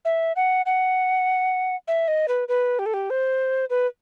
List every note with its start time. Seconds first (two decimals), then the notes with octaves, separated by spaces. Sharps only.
0.05 E5
0.36 F#5
0.66 F#5
1.88 E5
2.08 D#5
2.28 B4
2.48 B4
2.79 G4
2.86 A4
2.94 G4
3.10 C5
3.70 B4